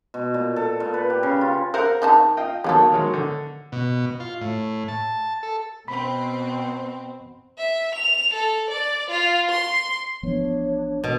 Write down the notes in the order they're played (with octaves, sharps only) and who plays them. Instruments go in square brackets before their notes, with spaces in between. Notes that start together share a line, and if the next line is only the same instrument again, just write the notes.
[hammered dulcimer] B2
A#2
A4
A#2
B4
G4
C#3
F4
[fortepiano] A#4 F5 F#5 [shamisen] C5
[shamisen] D#3 D#4 A5
[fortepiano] F4 D#5 G5
[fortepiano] D#3 F#3 A#3 [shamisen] B3 D#4 A4
[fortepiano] D#3 F#3 G#3
D3
[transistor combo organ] B2
F4
A2
A5
A4
[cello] B2 [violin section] C4 [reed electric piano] B5
[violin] E5
F7
A4
D5
F4
C6
[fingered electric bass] A1 F3 B3 [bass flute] D4 [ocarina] C#5
[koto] B2